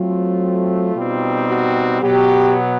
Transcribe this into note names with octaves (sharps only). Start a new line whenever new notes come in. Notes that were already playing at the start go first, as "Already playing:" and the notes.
Already playing: F#3 A3 C4 F4
B2 G3 C4 D#4
F#4
B2 F#3 B3 G4